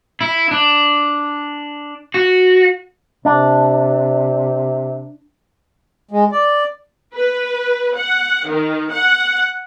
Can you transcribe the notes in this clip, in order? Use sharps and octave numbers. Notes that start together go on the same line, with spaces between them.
E4
D4
F#4
C3 D4
G#3
D5
B4
F#5
D#3
F#5